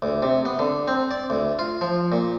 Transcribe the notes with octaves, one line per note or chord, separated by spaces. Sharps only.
D2
C3
B3
D3
C4
D5
D2
F4
F3
A#2